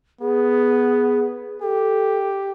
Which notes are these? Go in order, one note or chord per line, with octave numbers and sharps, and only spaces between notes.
B3 G#4
G4 A4